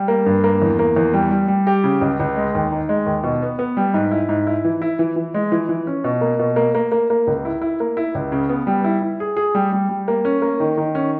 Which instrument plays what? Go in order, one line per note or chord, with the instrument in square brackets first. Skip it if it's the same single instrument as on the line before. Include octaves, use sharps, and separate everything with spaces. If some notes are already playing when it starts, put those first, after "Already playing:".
Already playing: [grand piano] G3
A#3
G2
A#3
E2
A#3
E2
G3
G3
G3
G4
C#3
C#2
C#2
G#3
D#2
D#4
G#3
D#2
B2
B3
B3
G3
G#2
E4
G#2
E4
E3
E4
E3
E3
G#3
E3
E3
C#4
B2
A#3
B2
A#3
A#3
A#3
A#3
C#2
E4
E4
A#3
E4
C#2
C#3
B3
G3
E4
E4
G#4
G#4
G3
G3
G3
A#3
C#4
A#3
D#3
D#3
C#4